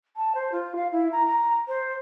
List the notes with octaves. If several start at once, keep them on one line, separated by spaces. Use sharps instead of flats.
A5
C5
F4
F5
E4
A#5
A#5
C5